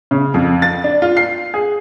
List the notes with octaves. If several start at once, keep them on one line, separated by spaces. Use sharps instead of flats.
C#3
F2
A6
D4
F4
C7
G#4